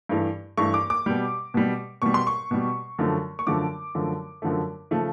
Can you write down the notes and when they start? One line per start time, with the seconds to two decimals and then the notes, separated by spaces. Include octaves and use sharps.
0.09 G2 E3 A3
0.57 G2 E3 A3 C#6
0.74 D6
0.90 D6
1.06 B2 G3
1.54 B2 G3
2.02 B2 G3 C#6
2.14 C6
2.27 C#6
2.51 B2 G3
2.99 F#2 D3 F3 A3
3.39 C#6
3.47 F#2 D3 F3 A3 D6
3.95 F#2 D3 F3 A3
4.42 F#2 D3 F3 A3
4.91 C#3 F3 A3